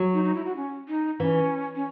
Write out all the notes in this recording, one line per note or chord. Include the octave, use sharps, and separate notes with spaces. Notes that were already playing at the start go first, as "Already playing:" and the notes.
Already playing: F#3
D#4
D#4
E4
F#4
C#4
D#4
E3 C#4
C#4